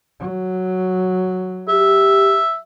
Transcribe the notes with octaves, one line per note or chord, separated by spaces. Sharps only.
F#3
G4 E5